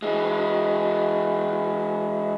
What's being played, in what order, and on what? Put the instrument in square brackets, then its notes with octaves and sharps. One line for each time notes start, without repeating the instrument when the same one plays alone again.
[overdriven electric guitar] E3 G#3